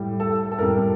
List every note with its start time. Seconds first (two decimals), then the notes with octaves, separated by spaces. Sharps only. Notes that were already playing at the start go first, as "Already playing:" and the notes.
Already playing: A2 G3
0.20 A4
0.52 A4
0.59 A2 G3 A#4